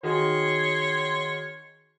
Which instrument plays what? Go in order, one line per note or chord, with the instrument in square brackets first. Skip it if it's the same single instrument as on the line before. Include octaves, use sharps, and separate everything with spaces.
[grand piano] D#3 F#4 G#4 [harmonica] C#5 C6